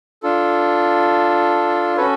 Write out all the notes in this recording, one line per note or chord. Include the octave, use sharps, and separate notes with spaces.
D4 F4 A4
C#4 F#4 A4 B4 C#5